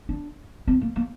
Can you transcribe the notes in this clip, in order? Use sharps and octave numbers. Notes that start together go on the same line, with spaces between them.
D4
C4
A#3
A#3